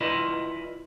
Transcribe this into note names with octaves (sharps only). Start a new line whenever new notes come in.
E4 F4 A#4 B4 D5 D#5